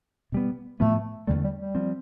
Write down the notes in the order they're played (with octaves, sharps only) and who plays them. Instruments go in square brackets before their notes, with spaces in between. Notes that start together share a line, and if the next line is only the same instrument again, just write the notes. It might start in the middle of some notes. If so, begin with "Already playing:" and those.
[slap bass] B2 G3 B3
[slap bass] A2 F3 B3 [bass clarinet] A3
[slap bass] E2 D3 A3 [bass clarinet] G3
[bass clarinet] G3
G3
[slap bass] F3 C4